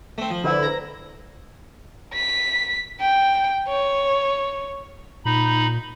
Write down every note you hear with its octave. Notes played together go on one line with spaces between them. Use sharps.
A3 C4
F3
D3 E4 B4 C5
A#5
B6
G5
C#5
A#2 D#4 B5